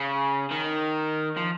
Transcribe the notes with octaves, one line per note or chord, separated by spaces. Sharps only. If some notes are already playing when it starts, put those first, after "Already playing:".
Already playing: C#3
D#3
F3